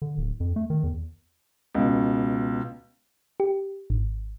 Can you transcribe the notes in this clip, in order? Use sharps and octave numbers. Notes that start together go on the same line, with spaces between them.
D3
D1
F2
A3
D#3
E2
C#2 B2
G4
G#1